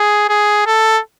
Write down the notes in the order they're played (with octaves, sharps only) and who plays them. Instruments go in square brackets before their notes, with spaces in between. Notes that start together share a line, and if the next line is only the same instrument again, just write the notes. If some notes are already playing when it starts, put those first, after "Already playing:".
Already playing: [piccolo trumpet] G#4
G#4
A4